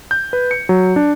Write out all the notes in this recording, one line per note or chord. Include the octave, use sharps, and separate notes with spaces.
G6
B4
C#7
F#3
D4